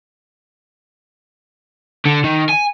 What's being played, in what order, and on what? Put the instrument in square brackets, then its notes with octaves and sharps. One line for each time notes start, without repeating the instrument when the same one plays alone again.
[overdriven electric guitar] D3
D#3
G#5